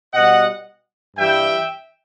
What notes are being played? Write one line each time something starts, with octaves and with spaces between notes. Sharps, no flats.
B2 G3 D#5 F#5
G2 E3 G3 E5 G5